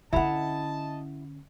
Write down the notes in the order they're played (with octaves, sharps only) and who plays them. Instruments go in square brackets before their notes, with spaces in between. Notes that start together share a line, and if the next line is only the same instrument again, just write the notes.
[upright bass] D3 C#4 [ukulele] E4 F#5 [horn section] D#5 A5 [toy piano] E5 B5